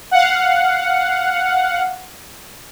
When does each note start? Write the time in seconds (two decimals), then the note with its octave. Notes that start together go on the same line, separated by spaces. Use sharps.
0.11 F5 F#5